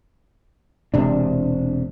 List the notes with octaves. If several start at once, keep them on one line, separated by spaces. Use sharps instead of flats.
E1 C3 D4